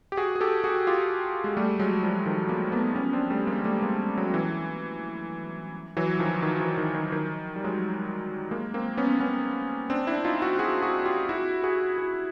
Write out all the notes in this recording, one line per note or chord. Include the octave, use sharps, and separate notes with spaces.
G4
F#4 G#4
G#4
G4 A4
F#4 G#4
F4 G4
G#3
G3 A3
F#3 G#3
F3 G3
D#3 F3
G#3 A#3
A3 B3
B3 C#4
C4 D4
G3 A3
G#3 A#3
G3 A3
G#3 A#3
F#3 G#3
E3
E3 F#3
D#3 F3
D#3
E3
D#3
D#3
D#3
G3
F#3 G#3
G#3 A#3
A#3 C4
B3 C#4
B3 C#4
C4 D4
D4 E4
D#4 F4
E4 F#4
F#4 G#4
F#4 G#4
F4 G4
E4 F#4
F#4 G#4
F#4 G#4